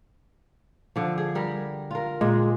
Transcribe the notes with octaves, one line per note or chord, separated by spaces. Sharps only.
D3 F3
G#4
G3 A#4
F4 A#4
A#2 G#3